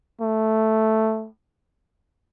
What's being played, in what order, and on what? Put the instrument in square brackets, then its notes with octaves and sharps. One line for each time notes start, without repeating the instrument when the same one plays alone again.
[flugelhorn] A3